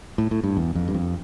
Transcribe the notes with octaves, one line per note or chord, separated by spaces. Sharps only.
A2
A2
G2
E2
F2
G2
F2